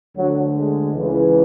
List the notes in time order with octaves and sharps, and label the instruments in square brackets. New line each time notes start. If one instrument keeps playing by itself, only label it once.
[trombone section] D2 D3 F#3
G#3
C#2 C#3 E3